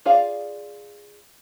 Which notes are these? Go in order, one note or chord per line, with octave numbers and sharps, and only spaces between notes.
F4 G#4 D5 F5